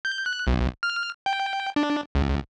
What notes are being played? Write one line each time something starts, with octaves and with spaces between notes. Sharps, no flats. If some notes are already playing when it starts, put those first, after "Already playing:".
G6
F#6
B1
F6
G5
D4
C#2